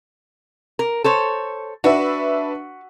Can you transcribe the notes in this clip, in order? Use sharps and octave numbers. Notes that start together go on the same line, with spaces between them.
A#4
A4 C5 C#5
D4 F#4 B4 E5